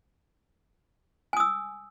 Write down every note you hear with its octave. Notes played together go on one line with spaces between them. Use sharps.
G#5 D#6 E6